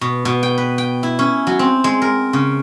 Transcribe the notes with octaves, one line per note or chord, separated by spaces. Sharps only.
B2
B2
G5
B4
G5
E4
C#4
F#3
C4
G#3
A#4
C#3